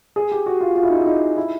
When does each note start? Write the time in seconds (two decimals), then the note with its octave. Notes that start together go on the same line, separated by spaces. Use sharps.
0.16 G#4
0.32 G4
0.46 F#4
0.61 F4
0.76 F4
0.83 E4
0.90 D#4
0.97 E4
1.06 D#4
1.37 E4